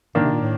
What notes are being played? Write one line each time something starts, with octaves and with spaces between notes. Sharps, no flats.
A2 D#3 A#3 D4
C3
A#2
A2